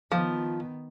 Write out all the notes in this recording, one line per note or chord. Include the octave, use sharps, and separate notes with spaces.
D#3 F3 B3